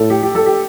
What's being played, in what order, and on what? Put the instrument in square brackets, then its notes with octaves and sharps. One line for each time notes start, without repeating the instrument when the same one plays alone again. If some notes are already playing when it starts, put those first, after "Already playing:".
Already playing: [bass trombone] A2 [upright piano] A4
[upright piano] G4
G4
A4
G4